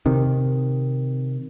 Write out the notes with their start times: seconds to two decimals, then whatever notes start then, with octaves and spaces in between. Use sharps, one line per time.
0.06 C3 D#3